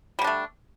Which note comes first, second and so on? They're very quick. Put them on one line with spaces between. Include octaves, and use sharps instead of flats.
G3 D3 D4 A3